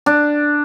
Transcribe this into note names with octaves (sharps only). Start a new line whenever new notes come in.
D4